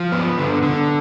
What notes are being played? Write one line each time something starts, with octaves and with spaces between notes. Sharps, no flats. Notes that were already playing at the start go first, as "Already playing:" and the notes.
Already playing: F3
B3
D3
D3